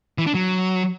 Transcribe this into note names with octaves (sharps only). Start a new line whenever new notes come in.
E3
D4
F#3